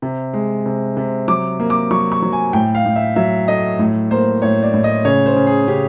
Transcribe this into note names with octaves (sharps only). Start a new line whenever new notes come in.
C3
G#3
C3
C3
F#3 D6
A#3
D6
F#3 C#6
C#6
F#3
G#5
A2 G5
F5
A2
E5
F#3 E5
A3 D#5
A2
A#3 C5
A2 C#5
D5
A2
D#5
C#3 C#5
C5
C#3
G#4
C#3 G4